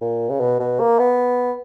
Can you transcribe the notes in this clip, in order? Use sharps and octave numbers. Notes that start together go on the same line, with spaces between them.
A#2
C#3
B2
B2
A#3
B3